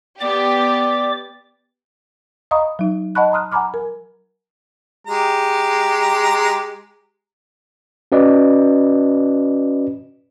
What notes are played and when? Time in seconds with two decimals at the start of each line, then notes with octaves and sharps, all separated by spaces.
0.21 B3 G4 D5 D6
2.51 D#5 F5 A#5 B5 C#6 D#6
2.79 F#3 D#4
3.15 D#5 F#5 A5 B5 C#6 F#6
3.32 A#5 C6 D#6 F6 F#6
3.52 F#5 G#5 A#5 B5 D6 F6
3.74 A#4
5.06 G#3 G4 A#5
8.12 C#4 F#4 B4 D5 D#5